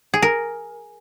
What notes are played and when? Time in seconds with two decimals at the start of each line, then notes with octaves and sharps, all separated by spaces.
0.14 G#4
0.22 A#4